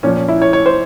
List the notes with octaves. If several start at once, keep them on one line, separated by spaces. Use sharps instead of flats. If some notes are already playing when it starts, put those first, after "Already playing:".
A#2 F3 C#4
C#4
E4
C#5
C#5
C5